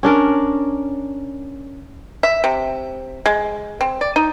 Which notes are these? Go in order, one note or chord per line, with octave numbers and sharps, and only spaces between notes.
C#4 D4 A#4
E5
C3
G#3
C4
D5
D#4